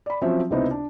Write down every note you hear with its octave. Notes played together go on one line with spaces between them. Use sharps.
D5 B5
F3 F#3 C4 C#4 E5
C#2 C3 B3 D#4 E4 C5
D4